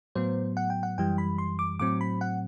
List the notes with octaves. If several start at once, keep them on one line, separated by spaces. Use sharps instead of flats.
A2 F#3 B3 C5
F#5
G5
F#5
F#2 E3 G3 G5
B5
C6
D6
A2 F#3 C4 D6
B5
F#5